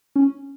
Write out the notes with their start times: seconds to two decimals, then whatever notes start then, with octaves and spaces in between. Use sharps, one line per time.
0.16 C#4